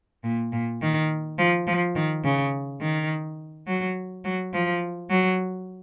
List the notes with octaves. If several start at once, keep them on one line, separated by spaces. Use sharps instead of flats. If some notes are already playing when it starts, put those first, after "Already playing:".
A#2
A#2
D#3
F3
F3
D#3
C#3
D#3
F#3
F#3
F3
F#3